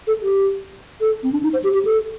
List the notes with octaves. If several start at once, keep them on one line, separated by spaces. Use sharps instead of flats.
A4
G4
A4
C4
D4
D#4
C5
G4
G4
A4